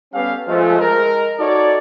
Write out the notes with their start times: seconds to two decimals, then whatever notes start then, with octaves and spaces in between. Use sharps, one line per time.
0.14 G3 B3 C#4 G4 A4 F5
0.48 F3 G#3 A3
0.80 G#3 A#4
1.39 D#4 F#4 A4 C#5 D5